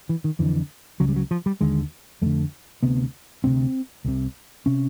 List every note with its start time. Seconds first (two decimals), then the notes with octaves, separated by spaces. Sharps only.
0.09 E3
0.24 D#3
0.39 F2 D3 E3
1.00 C#2 C#3 F#3
1.08 G3
1.16 F#3
1.31 F3
1.46 G3
1.61 D#2 D3 G#3
2.22 F2 D3 A3
2.83 D2 C3 B3
3.44 D2 C3 C4
4.05 C2 C3
4.66 C3 C#4